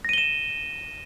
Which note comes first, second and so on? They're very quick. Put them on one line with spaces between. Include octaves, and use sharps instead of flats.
A#6 D#7 G7 E7